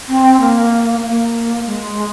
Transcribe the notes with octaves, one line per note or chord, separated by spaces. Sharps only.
C4
A#3
A#3
G#3